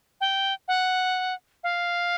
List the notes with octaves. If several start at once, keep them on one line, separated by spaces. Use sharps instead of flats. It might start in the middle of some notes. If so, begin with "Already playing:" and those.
G5
F#5
F5